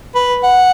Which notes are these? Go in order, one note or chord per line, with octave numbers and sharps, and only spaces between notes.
B4
F#5